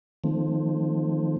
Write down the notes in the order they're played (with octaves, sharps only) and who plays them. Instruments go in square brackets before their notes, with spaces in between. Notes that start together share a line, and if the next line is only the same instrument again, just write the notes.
[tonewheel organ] D#3 F3 A3 C4